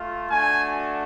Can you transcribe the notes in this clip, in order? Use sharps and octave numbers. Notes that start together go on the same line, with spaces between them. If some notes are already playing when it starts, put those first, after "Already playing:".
Already playing: A3 F4
A3 D4 F#4 G#5